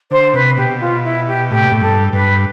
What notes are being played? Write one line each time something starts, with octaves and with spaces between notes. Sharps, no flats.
D3 C5
C3 B4
B2 G4
F4
E4
G4
A2 G4
B2
A2
G2 A4
G2 B4